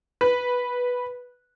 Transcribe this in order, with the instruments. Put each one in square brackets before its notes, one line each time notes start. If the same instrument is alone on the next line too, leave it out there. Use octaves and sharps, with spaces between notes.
[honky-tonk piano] B4